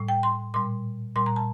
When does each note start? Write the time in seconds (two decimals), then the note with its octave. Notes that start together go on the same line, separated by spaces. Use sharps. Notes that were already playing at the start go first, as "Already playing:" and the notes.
Already playing: A2 G3
0.08 G5
0.23 C6
0.54 A#2 G3 C6
1.16 A#2 G3 C6
1.26 A#5
1.36 A5